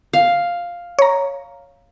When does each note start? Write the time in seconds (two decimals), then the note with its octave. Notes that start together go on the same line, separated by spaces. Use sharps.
0.13 F5
0.99 C#5 A#5